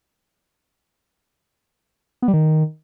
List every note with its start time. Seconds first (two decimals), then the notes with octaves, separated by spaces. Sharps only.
2.22 B3
2.28 G3
2.33 D#3